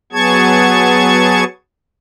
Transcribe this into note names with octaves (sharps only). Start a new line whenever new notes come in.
F#3 B3 G#4 A5 C#6 G#6